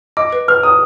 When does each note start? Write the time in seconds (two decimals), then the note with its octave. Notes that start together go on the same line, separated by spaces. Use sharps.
0.17 D#5 D6
0.32 B4
0.48 B4 F6
0.63 A#5 D#6